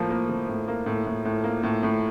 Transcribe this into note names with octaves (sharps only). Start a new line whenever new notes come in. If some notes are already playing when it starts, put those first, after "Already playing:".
Already playing: A2 F3 A#3
A#3
F3
A2
A#3
A2
A2
A2
A#3
A2
A2